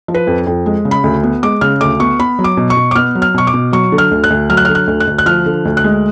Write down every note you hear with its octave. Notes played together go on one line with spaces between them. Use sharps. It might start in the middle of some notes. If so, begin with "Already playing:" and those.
F3
B4
F2
F2
G#3
C#3
B5
D2
B3
G#3 D6
C#3 F6
D2 D6
B3 C#6
B3 B5
F#3
D6
B2
C#6
B2
D6
B3 F6
F#3
F6
B2 C#6
D6
B2
F#3 C#6
D3
F6
D2
F#6
D2
F#3 F6
F#6
F6
D3
F#6
D2
F#6
D2
F#6
F3 F6
D3
D2
F#6
G#3